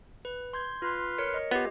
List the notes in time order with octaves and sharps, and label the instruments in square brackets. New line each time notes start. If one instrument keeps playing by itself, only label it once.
[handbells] B4
C6 G6 G#6
[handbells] F4 [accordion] B4 C6 F6
[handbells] A#4 C#5 C#7
D#5
[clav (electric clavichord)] B3 [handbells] F4 G4